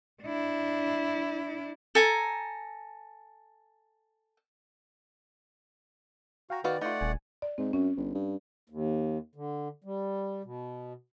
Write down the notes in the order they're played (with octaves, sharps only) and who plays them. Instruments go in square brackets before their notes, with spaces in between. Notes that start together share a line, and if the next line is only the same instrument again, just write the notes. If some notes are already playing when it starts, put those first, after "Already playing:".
[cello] D4 E4
[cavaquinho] A4 G#5 A#5
[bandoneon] F#4 [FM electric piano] F5 G5 A#5
[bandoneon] D#3 D5 [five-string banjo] D#4 F#4 F5 [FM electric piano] B4
[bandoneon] A3 D5 F#5 [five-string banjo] D#4 F4
[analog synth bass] D#1 [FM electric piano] G#5
[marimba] D5
[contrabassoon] G#2 [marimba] C4
[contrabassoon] F#2 [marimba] C#4
[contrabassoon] G1
G2
[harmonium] D#2
D3
G3
B2